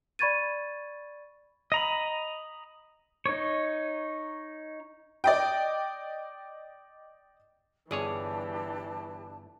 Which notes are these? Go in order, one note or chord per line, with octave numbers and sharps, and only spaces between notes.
D5 B5 C#6 G#6 A6 D#7
D#5 A#5 B5
D#4 C#5
D5 D#5 G5
G1 E3 D4 G4 G#4 C#5 D5 A5